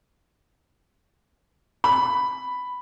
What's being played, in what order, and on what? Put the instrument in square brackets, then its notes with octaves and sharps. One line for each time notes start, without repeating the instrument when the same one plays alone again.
[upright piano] B5